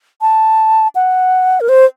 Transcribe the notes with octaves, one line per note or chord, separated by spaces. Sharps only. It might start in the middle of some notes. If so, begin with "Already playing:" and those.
A5
F#5
A#4
C5